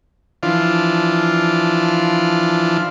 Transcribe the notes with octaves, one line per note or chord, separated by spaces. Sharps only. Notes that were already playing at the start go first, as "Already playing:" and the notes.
E3 F3 D4 F4